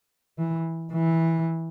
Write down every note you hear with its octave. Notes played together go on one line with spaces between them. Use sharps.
E3
E3